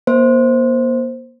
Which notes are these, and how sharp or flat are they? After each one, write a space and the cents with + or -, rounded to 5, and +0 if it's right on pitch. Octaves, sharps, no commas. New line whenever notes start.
A#3 +35 C5 +0